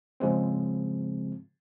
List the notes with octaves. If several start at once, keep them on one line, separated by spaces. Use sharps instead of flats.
G#2 C#3 F3 G#3 C4